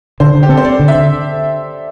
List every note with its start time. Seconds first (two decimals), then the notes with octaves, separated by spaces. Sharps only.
0.20 D3 C5
0.35 D3
0.43 G4
0.49 C4 A4
0.57 C5
0.65 C4 D5
0.80 D3
0.88 E5
0.95 D3